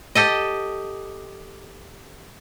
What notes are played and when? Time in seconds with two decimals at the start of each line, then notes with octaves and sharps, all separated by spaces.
0.15 G4 A4 D#5